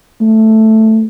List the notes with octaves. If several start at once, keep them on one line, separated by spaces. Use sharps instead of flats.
A3